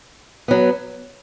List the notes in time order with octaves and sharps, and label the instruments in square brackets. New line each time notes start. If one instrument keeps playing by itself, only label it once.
[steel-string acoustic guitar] F#3 B3